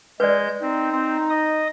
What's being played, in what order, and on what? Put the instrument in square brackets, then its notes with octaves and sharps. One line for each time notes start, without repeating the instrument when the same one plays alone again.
[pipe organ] G#3 G6 [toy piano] B4 D5
[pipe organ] C4 [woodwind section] D#4
[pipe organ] C4
D#5 D#6